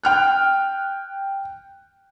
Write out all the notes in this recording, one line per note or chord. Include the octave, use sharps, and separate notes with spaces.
G5 F6 F#6